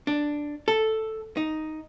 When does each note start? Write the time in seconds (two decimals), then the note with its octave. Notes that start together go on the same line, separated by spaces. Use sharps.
0.07 D4
0.68 A4
1.37 D#4